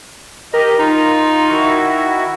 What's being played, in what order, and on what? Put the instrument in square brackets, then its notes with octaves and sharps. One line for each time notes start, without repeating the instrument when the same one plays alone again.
[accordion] G4 D#5 [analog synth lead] A#4
[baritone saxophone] D#4 [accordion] F4 [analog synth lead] A#5
[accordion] D#3 E4 F#4 [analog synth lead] C#6